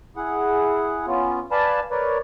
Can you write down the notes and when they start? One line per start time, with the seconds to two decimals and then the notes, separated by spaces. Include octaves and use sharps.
0.16 E4 G#4 F#5
1.07 B3 C#4 F4
1.51 B4 D5 F5 G#5 A5 B5
1.91 A#4 B4 C#5 D5